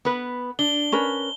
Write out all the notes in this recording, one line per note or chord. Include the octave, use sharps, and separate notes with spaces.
B3 B4
D4 G7
C#4 A#4 B4